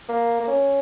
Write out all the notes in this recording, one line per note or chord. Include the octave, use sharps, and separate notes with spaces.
A#3
A#3
C#4